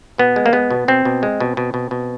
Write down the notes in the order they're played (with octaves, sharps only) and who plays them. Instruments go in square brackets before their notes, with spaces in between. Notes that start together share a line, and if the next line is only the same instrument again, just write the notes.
[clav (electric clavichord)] B2 B3
G#3
A#3
G#3 B3
B2
B2 C4
B2
G#3
B2
B2
B2
B2